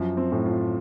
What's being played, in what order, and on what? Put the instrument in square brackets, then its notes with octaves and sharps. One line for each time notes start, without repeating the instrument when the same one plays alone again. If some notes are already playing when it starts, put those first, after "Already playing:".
Already playing: [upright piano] F#2 [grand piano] F3
[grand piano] C4
[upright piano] A2
[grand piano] F4